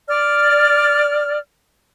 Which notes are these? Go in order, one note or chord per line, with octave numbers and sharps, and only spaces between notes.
D5 F6